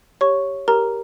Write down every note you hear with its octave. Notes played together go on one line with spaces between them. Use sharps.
G4 C#5 C#6
G4 A#4 A#5